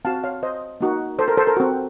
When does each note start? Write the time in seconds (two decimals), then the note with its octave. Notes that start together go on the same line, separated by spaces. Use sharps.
0.05 C4 F#4 F5 A5
0.24 C#5 F5
0.43 C5 D#5
0.81 A#3 D#4 F#4
1.19 A4 C5
1.28 A#4
1.37 A4 C5
1.47 A#4
1.57 C4 F#4